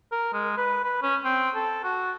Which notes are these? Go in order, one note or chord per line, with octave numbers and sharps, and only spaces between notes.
A#4
G#3
B4
B4
C#4
C4
A4
F#4